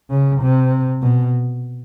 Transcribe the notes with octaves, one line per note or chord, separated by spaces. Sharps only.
C#3
C3
B2